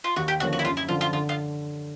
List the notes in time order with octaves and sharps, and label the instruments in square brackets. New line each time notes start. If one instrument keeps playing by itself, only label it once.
[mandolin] F4
[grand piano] D#2 [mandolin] F#4
[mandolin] G4
[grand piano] D3 F3 A#3 C#4 [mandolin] F#4
[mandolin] F#4
E4
[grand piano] F#2 [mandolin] F4
[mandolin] E4
[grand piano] D3 F3 [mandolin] F4
[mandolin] F4
[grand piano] D3 [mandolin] F4
[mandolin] F4